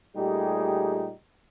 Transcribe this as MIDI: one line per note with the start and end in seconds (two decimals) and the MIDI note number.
0.16 1.10 46
0.16 1.10 55
0.16 1.10 57
0.16 1.10 63
0.16 1.10 67
0.16 1.10 68